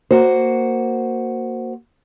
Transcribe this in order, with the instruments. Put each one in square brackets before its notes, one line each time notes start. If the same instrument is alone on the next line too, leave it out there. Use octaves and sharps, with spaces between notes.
[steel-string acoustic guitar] A#3 F#4 C5